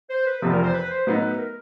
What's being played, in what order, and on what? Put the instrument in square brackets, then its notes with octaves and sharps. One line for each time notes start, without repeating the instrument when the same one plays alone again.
[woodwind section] C5
B4
[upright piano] F1 E2 C3 F3 [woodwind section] A4
[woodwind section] A#4
C5
B4
C5
[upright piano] A2 F#3 B3 D#4 [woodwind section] B4
[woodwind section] A#4